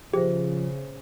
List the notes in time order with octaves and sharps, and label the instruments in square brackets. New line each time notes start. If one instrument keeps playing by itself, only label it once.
[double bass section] C#3 [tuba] F3 [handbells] G4 [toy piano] G#4 C5 E5